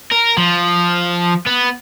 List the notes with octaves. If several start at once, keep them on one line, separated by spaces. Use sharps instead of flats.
A#4
F3
B3